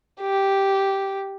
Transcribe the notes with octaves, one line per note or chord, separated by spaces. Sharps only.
G4